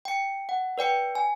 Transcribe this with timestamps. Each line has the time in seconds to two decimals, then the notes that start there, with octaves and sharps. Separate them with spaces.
0.05 G5 C#7
0.49 F#5
0.78 B4 D5 G5 C#7
1.15 G#5